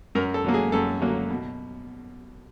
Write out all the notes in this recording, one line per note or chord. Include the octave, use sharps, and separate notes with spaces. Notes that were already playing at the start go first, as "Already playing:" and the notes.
F#2 A#4
A4
D3 F#3 A#3
G#4
F#2 A4
D3 F#3 A#3
B2